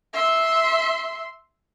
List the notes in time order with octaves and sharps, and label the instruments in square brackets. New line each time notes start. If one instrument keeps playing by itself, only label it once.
[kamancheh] E5 C6